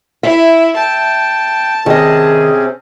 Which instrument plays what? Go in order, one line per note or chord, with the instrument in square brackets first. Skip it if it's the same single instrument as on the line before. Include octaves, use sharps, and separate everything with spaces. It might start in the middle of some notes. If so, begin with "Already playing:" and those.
[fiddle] E4 [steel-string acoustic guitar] E5
[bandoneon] G5 [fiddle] A5
[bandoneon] C3 C4 C#4 [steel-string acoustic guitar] D#3 D#5 [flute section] G#4